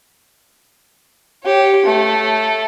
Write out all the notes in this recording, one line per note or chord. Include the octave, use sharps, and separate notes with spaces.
G4 C#5
A3